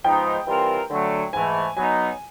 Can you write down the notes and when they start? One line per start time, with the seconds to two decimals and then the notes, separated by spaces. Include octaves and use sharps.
0.04 G#2 F3 G#3 B3 D#4 G5
0.47 E3 G3 C4 F4 A#4
0.91 D3 F#3 A3
1.33 G#2 E3 A3 G#5
1.77 F#3 B3 D#4 G#5